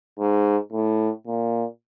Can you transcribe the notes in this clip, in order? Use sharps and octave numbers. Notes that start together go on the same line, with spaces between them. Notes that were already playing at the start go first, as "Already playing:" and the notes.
G#2
A2
A#2